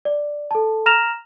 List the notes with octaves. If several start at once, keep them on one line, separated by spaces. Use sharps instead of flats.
D5
A4 A5
A#5 F6 A#6 E7 F7